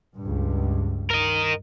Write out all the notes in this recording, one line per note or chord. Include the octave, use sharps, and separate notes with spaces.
C#2 G2
A#4 D#5